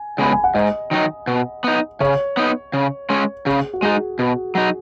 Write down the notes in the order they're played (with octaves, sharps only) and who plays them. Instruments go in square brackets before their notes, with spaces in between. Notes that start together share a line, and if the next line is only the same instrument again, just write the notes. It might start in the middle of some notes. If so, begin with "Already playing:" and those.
Already playing: [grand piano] G#5
[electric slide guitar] C#3 G#3 B3 [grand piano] B5
[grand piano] G#5
F#5
[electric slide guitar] G#2 [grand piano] D#5
[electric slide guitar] D#3 F#3 D#4
B2
B3 D#4
[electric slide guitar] C#3 [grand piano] C#5
[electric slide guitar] B3 D#4
C#3
G#3 C#4
[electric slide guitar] C#3 [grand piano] G#4
[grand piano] F#4
[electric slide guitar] G#3 D#4 [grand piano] G#4
[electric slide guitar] B2 [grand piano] F#4
[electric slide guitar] F#3 D#4